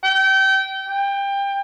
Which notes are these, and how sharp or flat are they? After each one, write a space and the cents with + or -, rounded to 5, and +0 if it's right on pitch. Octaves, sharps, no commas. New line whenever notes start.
G5 -25
G5 +25